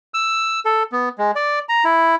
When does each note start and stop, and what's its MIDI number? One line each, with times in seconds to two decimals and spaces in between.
0.14 0.60 88
0.65 0.83 69
0.92 1.09 59
1.18 1.31 56
1.35 1.59 74
1.69 1.84 82
1.85 2.15 64